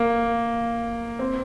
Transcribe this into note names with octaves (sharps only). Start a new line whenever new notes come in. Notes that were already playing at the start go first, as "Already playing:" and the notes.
Already playing: A#3
C4